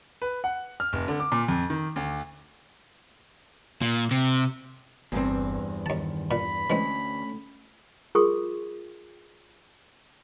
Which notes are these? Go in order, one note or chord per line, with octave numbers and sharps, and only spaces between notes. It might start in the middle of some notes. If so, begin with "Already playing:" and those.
B4
F#5
F6
F1
D3
D6
A#2
F2
D#3
D2
A#2
C3
G1 E2 G2 C4
D#2 D#3 A5
A#2 B5
D2 E3 G#3 C4 C#4
F4 G#4 A#4 C6 C#6 D#6